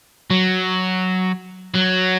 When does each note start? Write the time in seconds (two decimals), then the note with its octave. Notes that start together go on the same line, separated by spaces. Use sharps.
0.30 F#3
1.74 F#3